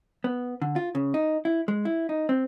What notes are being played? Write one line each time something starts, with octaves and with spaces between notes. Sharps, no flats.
B3
D3
F4
C#3
D#4
E4
G#3
E4
D#4
C4